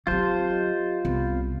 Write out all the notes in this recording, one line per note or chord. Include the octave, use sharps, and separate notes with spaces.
F#3 C4 F4 G4 C5 A5
G4 D#5
C2 B3